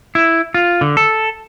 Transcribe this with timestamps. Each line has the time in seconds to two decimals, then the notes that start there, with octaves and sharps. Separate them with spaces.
0.15 E4
0.54 F4
0.81 D3
0.97 A4